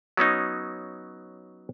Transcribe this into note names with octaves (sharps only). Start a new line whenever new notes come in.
F#3 B3 C#4 D#4